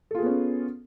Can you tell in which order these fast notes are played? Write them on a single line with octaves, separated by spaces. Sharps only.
A4 F4 G#4 B3 C#4